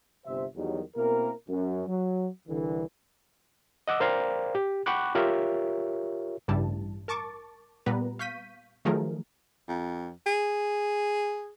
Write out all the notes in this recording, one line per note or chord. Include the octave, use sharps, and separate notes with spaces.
G1 C3 C5 E5
E2 D#3 F#3 G3
B2 A#3 C4 E4 A#4
F#2
F#3
C2 D3 E3
D#5 F#5 D6 E6
A#4 C5 D5 F5 G5 A#5
G4
F#5 G5 B5 C#6 D6 F#6
F4 G4 A#4 C#5 E5
A1 G2 C#3 G3 E4 A5
A#4 A5 C#6 D6 A6
A#2 G3 B3 B4 A#5
F5 C#6 G6 B6 D#7
D#3 F3 F#3 A3 G#4 A#4
F2
G#4